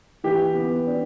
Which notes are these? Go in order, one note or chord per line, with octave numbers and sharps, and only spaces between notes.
E3 G4
B3
D4